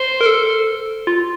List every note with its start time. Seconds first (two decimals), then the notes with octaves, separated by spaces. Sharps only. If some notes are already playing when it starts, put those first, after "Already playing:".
Already playing: C5
0.21 A#4
0.26 A4
1.07 F4